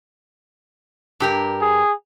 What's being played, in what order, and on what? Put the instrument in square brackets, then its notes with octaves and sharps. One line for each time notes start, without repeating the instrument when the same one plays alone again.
[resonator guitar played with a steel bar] G2 G4 A#4
[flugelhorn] G#4